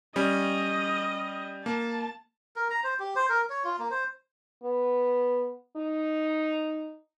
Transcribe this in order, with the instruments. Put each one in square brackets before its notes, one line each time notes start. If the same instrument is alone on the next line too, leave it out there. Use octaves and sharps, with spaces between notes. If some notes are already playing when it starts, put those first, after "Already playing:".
[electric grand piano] G3 C#4 [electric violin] D#5
[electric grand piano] A#3 [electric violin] A5
[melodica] A#4
A#5
C5
G4
C5
A#4
C#5
F4
A#3
C5
[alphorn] B3
D#4